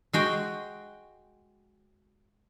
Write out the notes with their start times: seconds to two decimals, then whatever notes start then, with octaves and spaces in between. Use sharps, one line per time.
0.13 G#3 F#4 G5